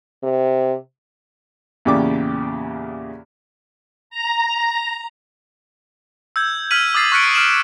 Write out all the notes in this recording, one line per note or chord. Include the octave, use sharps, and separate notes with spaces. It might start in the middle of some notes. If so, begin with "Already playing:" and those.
C3
E2 A#2 C#3 G4 D5 D6
A#5
E6 G6 G#6
F6 G6 G#6 B6 D#7 F#7
D6 D#6 F6 A6 C7
C#6 F6 F#6 B6 C#7 D7
D#6 F6 D7 E7 F#7